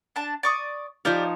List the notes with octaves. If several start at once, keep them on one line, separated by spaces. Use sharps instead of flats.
D4 A5
D5 C#6 D#6
F3 D#4 G4 C#5 D5 F5